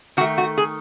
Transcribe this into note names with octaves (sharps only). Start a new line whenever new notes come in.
D#3 A3 F#4
F#4
G#4